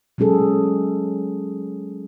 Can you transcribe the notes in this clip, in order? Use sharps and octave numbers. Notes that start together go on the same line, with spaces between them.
F#3 G#3 C#4 G#4 A4